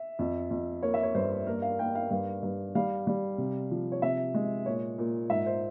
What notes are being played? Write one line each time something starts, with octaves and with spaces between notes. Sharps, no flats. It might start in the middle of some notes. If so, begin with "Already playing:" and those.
Already playing: E5
F2
F2
A#3 C#5
E5
C#5
G2 C5
A#3 A#4
F5
A#3 G5
F5
G2 F5
G2
G3 F5
G3
C3
F3
C#5
C3 E5
G#3
A#2 C#5
A#2
G#2 E5
C5